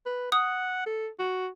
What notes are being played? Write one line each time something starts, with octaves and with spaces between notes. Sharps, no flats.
B4
F#5 D#6
A4
F#4